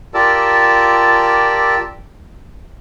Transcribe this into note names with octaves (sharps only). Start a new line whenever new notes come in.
F4 G4 A#4 D5 A5 E6